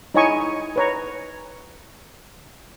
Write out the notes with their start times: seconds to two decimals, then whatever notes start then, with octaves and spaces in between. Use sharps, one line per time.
0.14 D#4 E4 C#5 D#5 G#5 C#6
0.76 B4 C#5 A#5